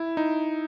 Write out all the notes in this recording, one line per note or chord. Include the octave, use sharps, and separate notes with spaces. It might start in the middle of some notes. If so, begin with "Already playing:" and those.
Already playing: E4
D#4